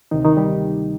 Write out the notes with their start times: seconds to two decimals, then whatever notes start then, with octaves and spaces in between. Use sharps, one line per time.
0.11 D2 C3 D#3 D#4
0.24 D#3 D#4
0.37 G3 G4